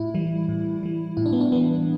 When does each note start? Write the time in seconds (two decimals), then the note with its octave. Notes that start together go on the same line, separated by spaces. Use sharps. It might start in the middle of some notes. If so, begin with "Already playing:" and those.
Already playing: A2 E4
0.14 E3 G3
0.49 A2
0.83 E3 G3
1.17 A2 E4
1.26 D4
1.33 B3
1.41 D4
1.52 E3 G3 B3